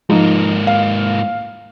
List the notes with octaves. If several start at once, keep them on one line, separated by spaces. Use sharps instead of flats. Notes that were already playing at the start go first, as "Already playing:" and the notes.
G#2 F3 A#3 D#4
F5